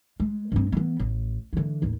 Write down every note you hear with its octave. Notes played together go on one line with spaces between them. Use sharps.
G#3
G2 C4
E3 B3
A1
D3 E3
A1 D#2